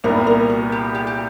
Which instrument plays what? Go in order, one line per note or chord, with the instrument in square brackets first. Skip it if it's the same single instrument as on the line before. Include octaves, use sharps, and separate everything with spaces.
[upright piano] C2 A#2 G3 B3 [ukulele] A#4
[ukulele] A#4
F#4
G4
G4
G4